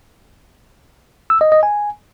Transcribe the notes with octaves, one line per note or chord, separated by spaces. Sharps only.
E6
D#5
D#5
G#5